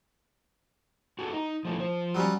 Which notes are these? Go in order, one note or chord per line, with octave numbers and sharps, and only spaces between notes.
F#4 G#4 A4
D#4
F3 A3 E4
F3 C5
F#3 G3 C#4